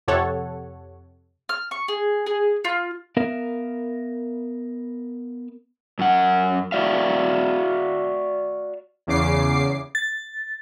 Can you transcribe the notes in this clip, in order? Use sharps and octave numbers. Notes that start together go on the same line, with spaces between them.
F2 C3 G4 A4 C#5 F#5
F6
C#6
G#4
G#4
F4
B3 A#4 E5 F5
F#2 F#5
F#4 D5 E5 F5
E2 C#3 D6 C7
A6